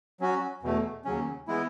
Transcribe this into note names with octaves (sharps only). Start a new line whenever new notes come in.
F#3 C#4 F#4
E2 B2 A3
D#2 C#3 F#3 C#4
E3 G#3 B3 E4